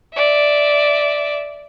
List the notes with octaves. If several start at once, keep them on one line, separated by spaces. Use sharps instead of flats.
D5 E5